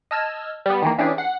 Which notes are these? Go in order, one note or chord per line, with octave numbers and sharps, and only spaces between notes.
D#5 A5 E6 F6 G#6
G3 B3
D#3 E3 A#3
E3 C#4 D4 G4 G#4
F#5 C7